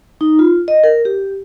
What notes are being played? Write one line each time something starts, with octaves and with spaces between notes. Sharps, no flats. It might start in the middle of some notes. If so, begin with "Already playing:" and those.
D#4
F4
D#5
A#4
G4